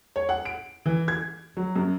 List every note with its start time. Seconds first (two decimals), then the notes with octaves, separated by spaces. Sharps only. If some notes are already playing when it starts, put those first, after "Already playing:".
0.16 C#5
0.29 F#5
0.45 D7
0.86 E3
1.08 G#6
1.57 F#3
1.76 F#2